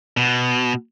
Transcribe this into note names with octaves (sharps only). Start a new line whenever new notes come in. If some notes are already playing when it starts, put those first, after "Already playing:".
B2